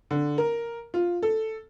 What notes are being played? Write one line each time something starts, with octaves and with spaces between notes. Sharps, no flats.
D3
A#4
F4
A4